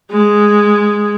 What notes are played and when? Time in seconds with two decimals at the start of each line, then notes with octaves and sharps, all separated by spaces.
0.12 G#3